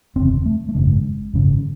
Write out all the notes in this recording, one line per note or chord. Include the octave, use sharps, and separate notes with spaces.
F#1 E2 C3 C4
A3
A3
G#1 F#2 C#3 G#3
G#1 F#2 C#3